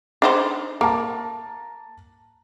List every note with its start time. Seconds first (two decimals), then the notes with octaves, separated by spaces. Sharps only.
0.22 D4 D#4 C5
0.81 A#3 A5 A#5